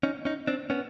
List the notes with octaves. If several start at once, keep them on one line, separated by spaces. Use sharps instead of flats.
C#4 D#4
C#4 D#4
C4 D4
B3 C#4